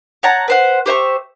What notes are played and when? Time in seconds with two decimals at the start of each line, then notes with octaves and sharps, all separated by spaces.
0.23 C#5 F#5 A5 A#5
0.48 B4 C5 F#5
0.86 G4 C5 E5 C#6